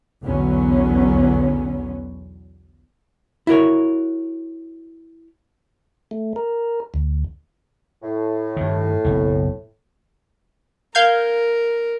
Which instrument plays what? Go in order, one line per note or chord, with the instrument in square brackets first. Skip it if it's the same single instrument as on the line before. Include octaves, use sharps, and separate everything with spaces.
[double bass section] B1 E2 D3 F#3 B3 C#4
[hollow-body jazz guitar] E4 F#4 A#4 C#5
[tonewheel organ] A3
A#4
D2
[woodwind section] A2
[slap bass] G2 D#3
F#1 B1
[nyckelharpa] A#4 [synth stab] F5 G6 G#6